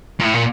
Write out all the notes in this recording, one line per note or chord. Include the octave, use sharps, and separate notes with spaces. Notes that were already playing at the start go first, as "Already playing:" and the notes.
A#2
A2
A#2